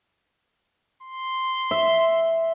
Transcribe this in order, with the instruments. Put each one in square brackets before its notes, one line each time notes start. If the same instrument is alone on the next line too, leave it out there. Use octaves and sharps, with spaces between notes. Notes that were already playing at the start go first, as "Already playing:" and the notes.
[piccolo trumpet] C6
[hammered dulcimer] E5